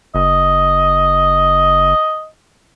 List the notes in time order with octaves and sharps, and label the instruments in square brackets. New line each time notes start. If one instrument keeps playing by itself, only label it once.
[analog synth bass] F#1 [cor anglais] D#5